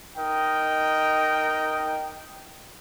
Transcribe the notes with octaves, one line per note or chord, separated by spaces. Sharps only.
D#4 A#4 D#5 G5